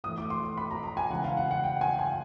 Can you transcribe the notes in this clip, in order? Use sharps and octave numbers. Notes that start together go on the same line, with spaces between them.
A2 E3 A3 D#6
D6
C6
B5
A#5
A#5
G#5
C#3 E3 G#3 F#5
F5
F#5
F#5
G5
G#5
G#5